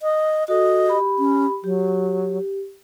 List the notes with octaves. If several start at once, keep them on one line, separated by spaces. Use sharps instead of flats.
D#5
F#4 A4 D#5
G4 B5
C#4
F#3 G4